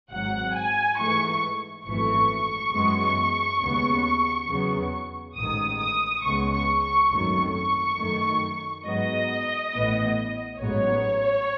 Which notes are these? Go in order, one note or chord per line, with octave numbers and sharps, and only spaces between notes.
G#1 G#2 F#3 F#5
G#5
G#2 E3 A3 C#6
G#1 F#2 E3 A3 C#6
F#2 E3 G#3 B3
D#2 C#3 G#3 B3
E2 C#3 F#3 B3
A1 G#2 D#3 D#6
D#6
C#2 C#3 G#3 B3 C#6
C#6
C#6
G#1 F#2 D#3 F#3 A3 C#6
C#6
F#2 D#3 A3
G#2 F#3 B3 D#5
A1 A2 E3 B3
A1 G#2 F#3 B3 C#5